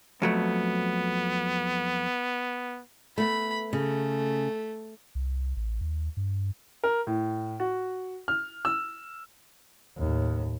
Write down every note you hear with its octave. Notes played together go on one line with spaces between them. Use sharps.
F2 F#3 A3 B3
A3 B3 B5
C#3 A3
C2
A1
D#2
G2
A#4
A2
F#4
F6
E6
D#2 A2